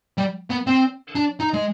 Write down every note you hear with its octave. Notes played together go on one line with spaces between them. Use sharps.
G3
B3
C4
D4
D#4
G#3